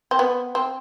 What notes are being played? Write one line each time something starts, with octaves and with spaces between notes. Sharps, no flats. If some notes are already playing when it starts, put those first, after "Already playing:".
C4
B3
C4